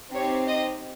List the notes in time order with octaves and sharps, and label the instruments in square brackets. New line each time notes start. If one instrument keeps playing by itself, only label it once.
[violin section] C4 D#4 G4 C#5
D#5